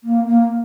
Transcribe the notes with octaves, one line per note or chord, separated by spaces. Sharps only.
A#3
A#3